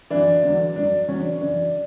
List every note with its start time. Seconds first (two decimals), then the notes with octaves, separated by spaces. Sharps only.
0.10 F#2 E3 D4
0.43 E2 D3 F#3
0.76 F#2 D3 F#3 D4
1.08 E2 C#3 F#3 C#4
1.19 D4
1.41 F#2 C#3 E3 D4